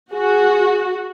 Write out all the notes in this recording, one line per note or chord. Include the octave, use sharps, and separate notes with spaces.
F#4 G#4